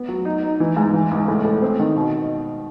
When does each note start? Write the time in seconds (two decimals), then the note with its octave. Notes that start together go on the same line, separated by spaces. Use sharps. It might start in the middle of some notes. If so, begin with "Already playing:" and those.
Already playing: B3
0.08 F#3
0.25 D#4
0.43 D#4
0.60 E3
0.77 G#2
0.93 E3
1.11 C#2
1.28 A2
1.44 A2
1.62 C4
1.79 D#3
1.96 B2